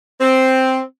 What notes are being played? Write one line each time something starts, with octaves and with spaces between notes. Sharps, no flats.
C4